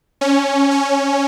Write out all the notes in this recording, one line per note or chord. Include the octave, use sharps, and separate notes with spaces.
C#4
C#4